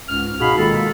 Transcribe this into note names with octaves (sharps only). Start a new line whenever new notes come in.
C#2 G#2 C#4 F6
B2 D#4 F#4 G#4 F5 B5
D#3 G#3 A#3 F4 A4